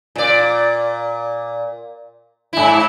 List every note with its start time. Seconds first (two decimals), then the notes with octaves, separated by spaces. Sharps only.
0.16 A#2 D5
2.53 G#2 E4